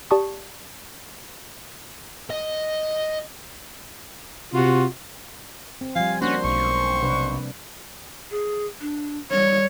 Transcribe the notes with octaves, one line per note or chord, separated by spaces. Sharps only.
G4 D5 A5 C#6 D#6
D#5
C3 F4 F#4
C4
F3 G3 F5 G#5
A#3 C#4 D4 F#4 C5
B1 C#6
C3 D4 B4
G#4
D4
G3 C#5